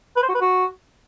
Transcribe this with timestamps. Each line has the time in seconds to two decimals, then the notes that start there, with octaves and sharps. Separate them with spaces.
0.17 B4
0.23 C5
0.29 F#4
0.35 B4
0.41 F#4